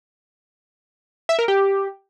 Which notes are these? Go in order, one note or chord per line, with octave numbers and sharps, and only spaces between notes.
E5
A#4
G4